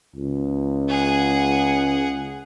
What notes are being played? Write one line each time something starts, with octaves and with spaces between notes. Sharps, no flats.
C#2
G#4 F#5